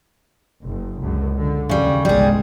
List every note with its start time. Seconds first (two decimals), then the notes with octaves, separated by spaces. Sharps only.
0.61 F#1
1.02 C#2 F#2 D3
1.37 D3
1.69 D#2 C#3 G3
2.05 G1 C2 G3 G#3 G#4